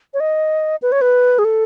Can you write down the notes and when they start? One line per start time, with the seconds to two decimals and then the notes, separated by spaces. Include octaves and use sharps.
0.14 C#5
0.20 D#5
0.82 B4
0.92 C#5
1.01 B4
1.39 G#4
1.45 A4